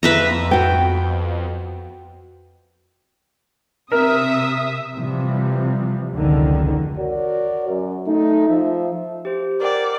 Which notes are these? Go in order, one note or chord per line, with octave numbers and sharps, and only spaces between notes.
F2 B4 E5 A#5
B3 F#4 G5
C3 C4 A#4 E5 D#6
C3 E3 F3 G3
F1 C#2 D3 D#3
F#4 A#4 C#5 D5
F#2
A3 D#4
F3 E5
G4 C5
A#4 D5 F#5 G5